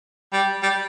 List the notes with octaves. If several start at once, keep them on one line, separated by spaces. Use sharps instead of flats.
G3
G3